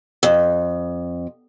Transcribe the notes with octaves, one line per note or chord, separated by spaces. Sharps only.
F2